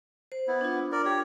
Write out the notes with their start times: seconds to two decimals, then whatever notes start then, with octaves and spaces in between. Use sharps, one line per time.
0.32 C5
0.48 B3 E4
0.61 D4 F4
0.92 A#4 D5
1.05 G4 C#5